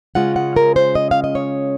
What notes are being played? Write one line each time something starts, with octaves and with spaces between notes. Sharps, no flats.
C#3 G#3 C#4 F4 F#5
F#5
A#4
C5
D#5
F5
D#5
C#5